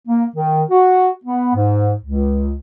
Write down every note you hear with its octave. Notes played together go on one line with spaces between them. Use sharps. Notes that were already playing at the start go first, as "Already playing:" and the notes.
A#3
D#3
F#4
B3
G#2
C#2